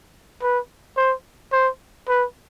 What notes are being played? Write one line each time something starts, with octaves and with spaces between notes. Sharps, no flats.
B4
C5
C5
B4